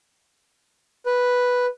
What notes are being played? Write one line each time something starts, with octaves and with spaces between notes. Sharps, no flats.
B4